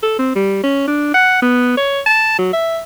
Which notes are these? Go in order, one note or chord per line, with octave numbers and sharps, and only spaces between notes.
A4
C4
G3
C#4
D4
F#5
B3
C#5
A5
F#3
E5